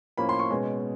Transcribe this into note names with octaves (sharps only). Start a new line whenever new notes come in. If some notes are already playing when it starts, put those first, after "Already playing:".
A2 F3 A#3 C#4 B5
C6
C#6
B2 G#3 C#4